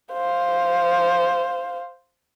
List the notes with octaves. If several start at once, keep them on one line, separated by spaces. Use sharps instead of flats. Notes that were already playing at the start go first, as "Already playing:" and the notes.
C5 F5